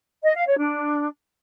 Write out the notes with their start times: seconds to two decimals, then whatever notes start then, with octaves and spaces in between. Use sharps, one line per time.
0.24 D#5
0.35 F5
0.47 C#5
0.59 D4